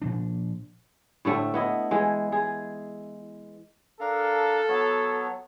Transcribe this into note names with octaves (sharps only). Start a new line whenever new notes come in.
A#2 F3 D4
A2 D3 A3 C4
B3 E4 D#5
E3 G#3
G#3 G#4
D4 A4 A#4 F5
F#3 B3 C#5